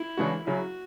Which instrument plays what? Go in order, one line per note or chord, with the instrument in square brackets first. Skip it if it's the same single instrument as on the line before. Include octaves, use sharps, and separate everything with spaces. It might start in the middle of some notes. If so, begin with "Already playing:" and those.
Already playing: [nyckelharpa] E4
[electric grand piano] C#3 E3 G#3 D4 F#4
[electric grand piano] C#3 F#3 C#4 E4 [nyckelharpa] F#4